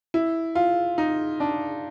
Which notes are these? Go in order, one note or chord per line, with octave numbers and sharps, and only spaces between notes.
E4
F4
D#4
D4